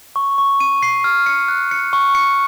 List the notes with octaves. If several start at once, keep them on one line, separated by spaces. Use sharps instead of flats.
C#6
C#6
D#7
C7
F6
C#7
F#6
C#7
C#6
C#7